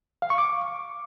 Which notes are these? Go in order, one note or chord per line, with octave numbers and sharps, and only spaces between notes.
F5
C#6
D6